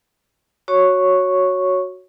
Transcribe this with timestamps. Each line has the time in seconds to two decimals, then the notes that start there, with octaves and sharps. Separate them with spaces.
0.68 F#4 C#5 C#6